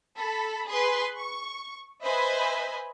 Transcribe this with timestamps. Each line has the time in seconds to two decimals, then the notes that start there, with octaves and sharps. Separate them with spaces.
0.17 A4 B5
0.67 G#4 B4 C6
1.17 C#6
2.03 B4 C5 D#5 E5 G#5 B5